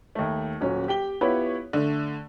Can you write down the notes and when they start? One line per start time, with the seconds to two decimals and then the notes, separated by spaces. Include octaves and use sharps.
0.15 D#2 A3
0.61 D#1 F#3 C#4
0.88 G4 G5 G7
1.21 B3 E4 F4 G4 B4 C#5
1.73 D3 A3